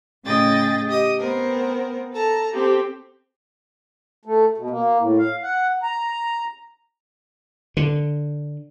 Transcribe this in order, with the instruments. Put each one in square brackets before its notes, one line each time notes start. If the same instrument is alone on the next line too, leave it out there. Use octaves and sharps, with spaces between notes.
[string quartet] A2 C#3 G#4 D#5 G5 A6
G4 D#5 D#6
B3 C4 A#4
A4 A5 A#5
C4 G4 A4
[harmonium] A3
B2
A#3
A2
F5
F#5
A#5
[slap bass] D3